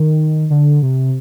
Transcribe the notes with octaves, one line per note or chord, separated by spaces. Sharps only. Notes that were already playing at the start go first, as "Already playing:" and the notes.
Already playing: D#3
D3
C3